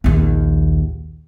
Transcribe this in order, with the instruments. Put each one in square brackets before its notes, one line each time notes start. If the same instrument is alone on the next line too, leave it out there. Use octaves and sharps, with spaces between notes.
[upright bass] A#1 D#2